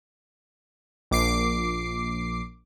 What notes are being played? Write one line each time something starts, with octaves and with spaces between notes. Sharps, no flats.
A#1 D6 C7